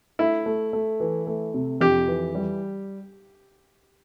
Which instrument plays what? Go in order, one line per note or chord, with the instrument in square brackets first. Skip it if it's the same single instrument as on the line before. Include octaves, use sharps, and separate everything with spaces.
[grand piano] A3 [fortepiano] E4
[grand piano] A3
A3
E3
A3
C3
[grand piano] F2 [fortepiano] G4
[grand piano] E3
G3